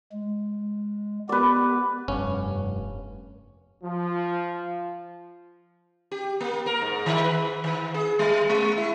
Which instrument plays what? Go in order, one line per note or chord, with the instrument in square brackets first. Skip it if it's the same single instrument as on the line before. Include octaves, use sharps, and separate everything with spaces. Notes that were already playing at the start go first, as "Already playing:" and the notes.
[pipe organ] G#3
[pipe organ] B3 G4 [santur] B4 D5
[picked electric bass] F1 G2 [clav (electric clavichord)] C#4
[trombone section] F3
[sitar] G4
A#3
A#4
G#2
D#3
B4
D#3
G#4
G3
G#3
E4